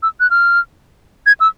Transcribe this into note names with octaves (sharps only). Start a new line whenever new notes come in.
E6
F#6
F6
G#6
E6